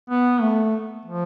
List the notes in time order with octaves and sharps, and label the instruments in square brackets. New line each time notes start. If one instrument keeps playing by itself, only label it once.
[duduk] B3
A3
F3